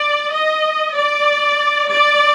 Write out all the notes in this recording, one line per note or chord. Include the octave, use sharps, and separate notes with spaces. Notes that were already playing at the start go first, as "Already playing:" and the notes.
Already playing: D5
D#5
D5
D5